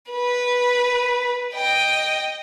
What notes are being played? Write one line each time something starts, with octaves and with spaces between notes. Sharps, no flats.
B4
D#5 G5